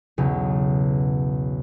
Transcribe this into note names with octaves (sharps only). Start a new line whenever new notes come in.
B1 E2 C#3